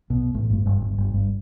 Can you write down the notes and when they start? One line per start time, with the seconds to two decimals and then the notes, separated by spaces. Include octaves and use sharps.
0.10 B1 B2
0.34 A1 A2
0.50 G1 G2
0.66 G1 G2
0.81 G1 G2
0.98 G1 G2
1.14 G1 G2